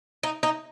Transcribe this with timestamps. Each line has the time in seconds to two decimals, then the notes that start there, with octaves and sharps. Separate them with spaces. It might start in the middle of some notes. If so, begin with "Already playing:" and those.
0.23 D#4
0.43 D#4